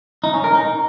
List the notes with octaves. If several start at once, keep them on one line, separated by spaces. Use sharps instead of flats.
D#4
C#4
A#4
D#4